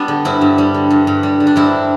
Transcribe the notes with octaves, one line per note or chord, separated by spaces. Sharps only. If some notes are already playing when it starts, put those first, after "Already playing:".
Already playing: G3 B3 D4
D3
G2 C4 E4
G2
G3
D3
G2
G2
G3
D3
D4
G2 C4 E4